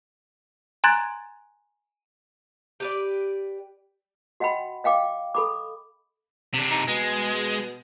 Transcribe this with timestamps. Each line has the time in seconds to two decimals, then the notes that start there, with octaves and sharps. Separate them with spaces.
0.84 G#5 A#5 C6 F#6 G#6 A6
2.80 G4 B4 D5
4.40 F#4 D#5 F#5 G5 B5
4.84 D#5 F5 G5 D6
5.35 A4 B5 D6
6.54 C3 D4
6.71 D#4
6.88 B2 G#3